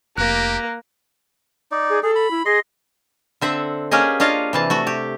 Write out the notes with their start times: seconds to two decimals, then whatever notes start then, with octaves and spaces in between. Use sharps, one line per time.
0.18 F1 A#3 G4 F#6 A#6
1.71 D#4 D5
1.90 G#4
2.03 G#4 A4
2.16 B5
2.31 E4
2.46 G#4 D#5 C6
3.41 D3 C4 E5 F#5
3.91 A#3 C#4 G4 G#4 D#5
4.20 D4 F4 C#5 D#5 F5
4.53 C3 E3 A5
4.70 A3 F#4
4.87 G4